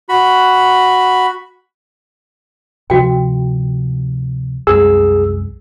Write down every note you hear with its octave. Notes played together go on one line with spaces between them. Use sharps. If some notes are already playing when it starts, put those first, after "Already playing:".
F#4 B5
D2 C3 F3 F#4 G5
C2 F#2 G#3 G#4 E6